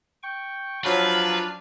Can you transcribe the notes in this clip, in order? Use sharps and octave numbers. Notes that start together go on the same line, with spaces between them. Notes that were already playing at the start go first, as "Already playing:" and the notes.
G5 C#6
F3 F#3 D4 B4 F6